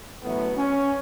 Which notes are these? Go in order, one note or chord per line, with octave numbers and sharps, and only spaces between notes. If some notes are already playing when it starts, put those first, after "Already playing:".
A1 A2 F#3 A3 B3
C#4